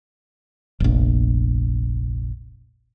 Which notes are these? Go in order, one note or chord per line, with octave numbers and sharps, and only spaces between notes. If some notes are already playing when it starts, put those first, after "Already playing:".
F1 A#1